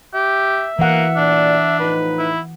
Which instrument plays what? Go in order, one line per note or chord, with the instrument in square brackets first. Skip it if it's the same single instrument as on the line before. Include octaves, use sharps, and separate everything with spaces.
[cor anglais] G4 [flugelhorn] E5
[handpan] E3 F#5 [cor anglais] A#3
[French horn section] A#2 D5 [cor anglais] D4
[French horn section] A2 F3 D#4 [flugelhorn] B4
[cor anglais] E4